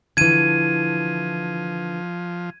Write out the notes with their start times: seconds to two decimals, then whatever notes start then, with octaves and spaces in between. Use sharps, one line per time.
0.17 D3 E3 F3 G#6 D#7